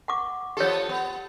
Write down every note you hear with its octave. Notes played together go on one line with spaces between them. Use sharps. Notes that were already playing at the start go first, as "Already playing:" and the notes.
F#5 C#6 D6
F3 B3 G4 A4 C#5
B3